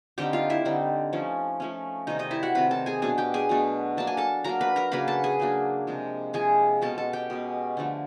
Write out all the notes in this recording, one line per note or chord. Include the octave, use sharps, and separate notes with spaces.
D3 G3 C4 D#4 G4 G5
F4 F5
E4 E5
D3 G3 C4 D#4
F3 A3 C#4
F3 A3 C#4
C3 D#3 G3 C4 D#4 D#5
D#4 D#5
E4 E5
F#4 F#5
C3 D#3 G3 C4 B4 B5
A4 A5
G#4 G#5
B2 F#3 A3 D4 G#4 G#5
G4 G5
G#4 G#5
B2 F#3 A3 D4
F#3 A#3 D4 A5
G#5
A4 A5
F#3 A#3 D4 A#4 A#5
B4 B5
A#4 A#5
C#3 F#3 A#3 D4 B4 B5
A4 A5
G#4 G#5
C#3 F#3 A#3 D4
C3 F3 G#3
C3 F3 G#3 G#4 G#5
B2 G#3 C#4 A4 A5
A4 A5
G4 G5
B2 G#3 C#4
D3 F3 A3